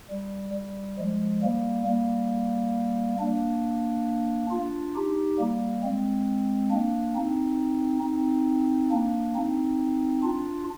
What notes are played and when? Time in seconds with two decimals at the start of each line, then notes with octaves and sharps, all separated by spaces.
0.11 G3
0.54 G3
0.99 F3 G#3
1.43 G3 A#3
1.87 G3 A#3
3.19 A#3 D4
4.50 D4 F4
4.95 D#4 G4
5.39 G3 A#3
5.83 G#3 C4
6.71 A#3 D4
7.15 C4 D#4
8.03 C4 D#4
8.91 A#3 D4
9.35 C4 D#4
10.23 D4 F4